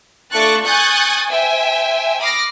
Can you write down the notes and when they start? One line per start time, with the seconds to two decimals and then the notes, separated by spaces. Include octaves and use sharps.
0.32 A3 D4 F4 C#6 F#6 A6
0.64 G#5 C#6 D#6 F#6 G6 A6
1.29 C5 E5 G5 G#5
2.21 B5 D6 D#6 F6 A#6 C7